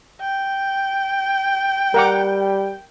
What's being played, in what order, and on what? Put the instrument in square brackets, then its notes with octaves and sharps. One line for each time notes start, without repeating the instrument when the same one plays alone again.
[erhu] G5
[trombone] G3 [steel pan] A#4 F#5 D6